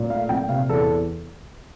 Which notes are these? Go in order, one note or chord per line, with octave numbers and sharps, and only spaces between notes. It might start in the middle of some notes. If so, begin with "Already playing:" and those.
Already playing: A#2
A3 F5
A#2 G5
C3 F5
E2 A4